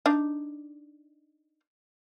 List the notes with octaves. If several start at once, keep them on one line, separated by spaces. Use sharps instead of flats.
D4 D#4